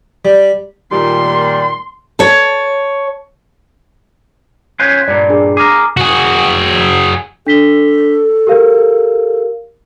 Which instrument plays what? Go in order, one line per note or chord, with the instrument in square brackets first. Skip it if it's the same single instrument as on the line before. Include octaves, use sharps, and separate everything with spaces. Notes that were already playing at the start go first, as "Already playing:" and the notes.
[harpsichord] G3
[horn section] A#2 D#3 G3 [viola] C6
[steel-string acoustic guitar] C#5 A5
[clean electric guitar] C#4 F4 C5 [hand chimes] F#6 G#6 B6
[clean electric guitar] G2 A#2 [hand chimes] D5
[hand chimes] D4 G#4
[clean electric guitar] G#4 A#4 [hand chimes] D6
[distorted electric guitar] F#4 G#4
[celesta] D4 B6 G7 [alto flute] A4
[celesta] G4 A#4 F5